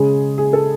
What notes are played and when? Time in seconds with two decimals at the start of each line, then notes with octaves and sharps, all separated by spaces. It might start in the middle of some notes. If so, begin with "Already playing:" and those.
Already playing: C#3 G#3 G#4
0.38 G#4
0.53 A4